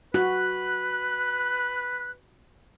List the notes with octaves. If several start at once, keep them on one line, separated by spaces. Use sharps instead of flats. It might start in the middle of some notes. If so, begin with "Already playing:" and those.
F#4 B4 F#6